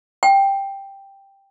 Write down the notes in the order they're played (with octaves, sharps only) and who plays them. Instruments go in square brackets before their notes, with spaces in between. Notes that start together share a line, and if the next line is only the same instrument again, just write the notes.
[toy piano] G5